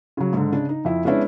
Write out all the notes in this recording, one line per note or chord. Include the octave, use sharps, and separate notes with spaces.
C#3 F#3
G#2 D3
C#3 D4
D#4
F2 E4
G#3 B3 C#4 D4 E4